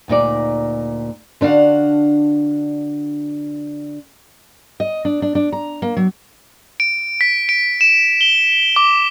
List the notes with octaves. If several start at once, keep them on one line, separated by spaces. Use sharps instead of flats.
D2 A#2 D#4 D5
D3 D4 F#4 F5 F#5
D#5
D4
D4
D4
A#5
A#3
F#3
D7
B6
D7
E7
G7
D6